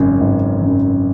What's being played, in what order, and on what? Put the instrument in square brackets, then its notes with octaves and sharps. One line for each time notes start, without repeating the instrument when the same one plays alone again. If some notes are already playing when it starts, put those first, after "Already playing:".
Already playing: [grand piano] G#1 F#2 C#3
G#1
F#2 C#3